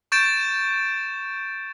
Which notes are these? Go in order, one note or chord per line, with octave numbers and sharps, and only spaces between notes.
C#6 G6 A6 D7 E7